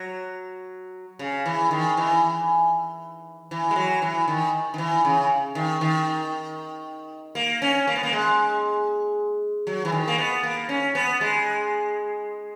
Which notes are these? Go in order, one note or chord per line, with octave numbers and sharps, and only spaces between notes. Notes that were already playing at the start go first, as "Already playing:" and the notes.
Already playing: F#3
C#3
E3
D#3
E3
E3
G#3
F#3
E3
D#3
D#3
E3
C#3
D#3
D#3
A#3
C#4
A#3
B3
A#3
G#3
F#3
E3
D#3
A#3
B3
A#3
C#4
B3
G#3